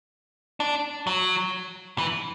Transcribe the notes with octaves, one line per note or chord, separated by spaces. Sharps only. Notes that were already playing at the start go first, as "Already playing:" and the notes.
D4
F#3
E3